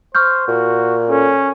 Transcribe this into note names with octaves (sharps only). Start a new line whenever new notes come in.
C5 C#6 F6 G6
A#2 F#4
C#4 A4